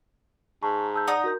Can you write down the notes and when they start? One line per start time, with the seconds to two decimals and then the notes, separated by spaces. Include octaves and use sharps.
0.63 G#2 A5 A#5 C#6
0.94 A5 E6 G6
1.08 D#4 D5 F#5 A#5 D#6
1.24 F#4 A#4 G6